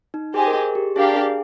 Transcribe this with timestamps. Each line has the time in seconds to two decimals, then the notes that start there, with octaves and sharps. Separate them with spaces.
0.14 D#4
0.34 G4 G#4 C5 D#5 G#5
0.47 A#4
0.55 G#4
0.75 G4
0.96 D4 G4 G#4 A#4 D5 F5
1.16 G#4